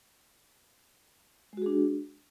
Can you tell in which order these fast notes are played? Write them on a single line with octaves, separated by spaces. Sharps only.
G#3 F#4 G#4 D4